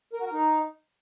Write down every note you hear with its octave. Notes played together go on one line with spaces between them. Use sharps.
A#4
F#4
A#4
D#4